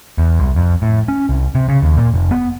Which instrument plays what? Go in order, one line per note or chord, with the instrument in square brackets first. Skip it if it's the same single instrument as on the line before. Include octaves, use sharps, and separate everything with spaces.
[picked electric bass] E2
C2
F2
A2
C#4
C2
C3
C#3
D#2
A#2
F1
B3